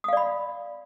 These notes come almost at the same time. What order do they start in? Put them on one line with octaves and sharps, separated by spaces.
D#6 F5 D5 B5